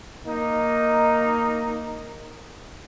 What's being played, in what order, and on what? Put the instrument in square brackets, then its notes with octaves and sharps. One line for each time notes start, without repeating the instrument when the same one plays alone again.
[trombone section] A#3 D#4